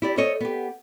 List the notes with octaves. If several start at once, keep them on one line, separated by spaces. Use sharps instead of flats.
E4 G4 D5
A4 C5 C#5 D#5
B3 G4